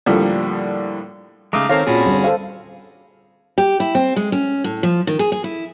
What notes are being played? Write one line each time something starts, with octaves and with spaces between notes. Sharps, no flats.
A2 D3 F3 G3 A#3
C#3 G#3 A3 D#4 F5 A#5 D6
D#3 C4 A4 C#5 F5 A#5
A#2 C4 C#4 F#4 G#4 A5 B5
G1
D3 A4 C5 F5
G4
E4
C4
G#3
C#4
A2
F3
D#3
G#4
G#4
E4